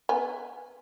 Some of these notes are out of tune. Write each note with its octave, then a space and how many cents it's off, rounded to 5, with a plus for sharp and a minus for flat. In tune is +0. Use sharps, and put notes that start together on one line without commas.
B3 +0 G#5 +0